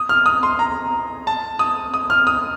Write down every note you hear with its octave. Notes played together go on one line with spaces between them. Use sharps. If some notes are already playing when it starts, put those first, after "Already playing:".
Already playing: D#6
F6
D#6
C6
A#5
A5
D#6
D#6
F6
D#6